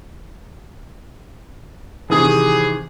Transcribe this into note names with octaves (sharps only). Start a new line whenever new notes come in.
C3 D#3 E3 G#4